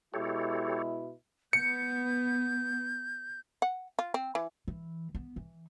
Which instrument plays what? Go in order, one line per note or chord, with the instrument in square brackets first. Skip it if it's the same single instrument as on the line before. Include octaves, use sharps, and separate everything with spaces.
[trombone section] B2 G#3 E4 [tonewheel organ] G4 A4 C#5
[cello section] B3 [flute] G6 [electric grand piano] C#7
[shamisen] F#5
F4
C4
E3
[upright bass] E3
B3
E3